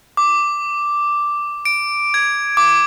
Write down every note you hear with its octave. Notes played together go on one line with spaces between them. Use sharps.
D6
D7
G#6
D6